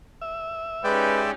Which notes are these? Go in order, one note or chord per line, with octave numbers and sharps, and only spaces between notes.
E5
G#3 C#4 D#4 G4 B4 D5 G5